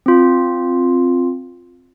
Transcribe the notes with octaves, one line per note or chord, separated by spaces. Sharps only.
C4 F4